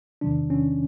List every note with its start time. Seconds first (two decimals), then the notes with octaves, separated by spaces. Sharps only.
0.21 E2 C3 D#3 F#3 D4
0.50 C#4